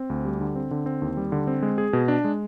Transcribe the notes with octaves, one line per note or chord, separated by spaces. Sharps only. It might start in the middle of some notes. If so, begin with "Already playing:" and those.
Already playing: C4
D2
G3
D3
C4
D3
C4
D#2
G3
D3
C4
G#3
G#4
B2
D4
G#3